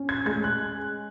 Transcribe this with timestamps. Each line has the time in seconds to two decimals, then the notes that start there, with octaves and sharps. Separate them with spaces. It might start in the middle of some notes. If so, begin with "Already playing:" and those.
Already playing: C#4
0.09 G#6
0.26 G#3 G#6
0.44 F#6